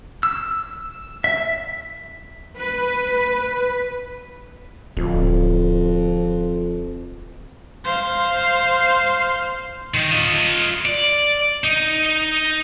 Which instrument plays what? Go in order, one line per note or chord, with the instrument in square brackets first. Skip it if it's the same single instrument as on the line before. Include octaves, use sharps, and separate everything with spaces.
[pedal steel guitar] E6
E5
[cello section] B4
[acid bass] D1 [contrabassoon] F2
[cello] C5 F5
[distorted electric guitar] D#3
F4 D#5
D5
D#4